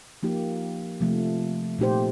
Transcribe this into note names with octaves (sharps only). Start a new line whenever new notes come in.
F3 A#3 D#4 G4
C3 F3 A3
A#2 A3 D#4 G4 C5